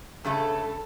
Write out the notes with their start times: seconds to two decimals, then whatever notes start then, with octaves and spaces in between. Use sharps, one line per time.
0.24 G2 C#3 A3 A4